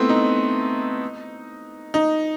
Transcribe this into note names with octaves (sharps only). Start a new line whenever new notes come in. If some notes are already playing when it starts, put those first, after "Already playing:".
Already playing: A3 B3 C4 E4
D#4
D#4